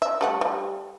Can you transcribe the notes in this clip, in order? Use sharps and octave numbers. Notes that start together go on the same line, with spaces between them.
E5
G3 A3 F#5
G3